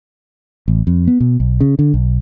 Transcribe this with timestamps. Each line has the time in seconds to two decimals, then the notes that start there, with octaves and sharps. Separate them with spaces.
0.68 A1
0.87 F2
1.08 B3
1.20 B2
1.40 B1
1.60 C#3
1.79 D3
1.94 B1